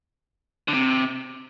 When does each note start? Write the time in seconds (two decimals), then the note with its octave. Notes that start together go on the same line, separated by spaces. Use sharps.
0.68 D3
0.74 C3